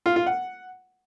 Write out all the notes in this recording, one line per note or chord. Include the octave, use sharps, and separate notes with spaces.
F4
F4
F#5